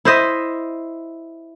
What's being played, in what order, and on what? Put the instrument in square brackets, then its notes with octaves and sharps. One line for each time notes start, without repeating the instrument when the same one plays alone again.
[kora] E4 C5 D#5 E5